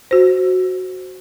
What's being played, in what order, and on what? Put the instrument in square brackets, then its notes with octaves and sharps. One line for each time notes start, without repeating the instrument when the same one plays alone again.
[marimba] F#4 C5